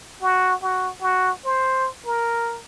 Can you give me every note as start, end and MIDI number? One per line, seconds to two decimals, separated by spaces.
0.22 0.55 66
0.62 0.91 66
1.01 1.31 66
1.45 1.89 72
2.06 2.61 70